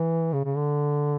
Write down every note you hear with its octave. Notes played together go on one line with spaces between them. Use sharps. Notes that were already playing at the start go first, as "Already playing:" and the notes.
Already playing: E3
C#3
C#3
D3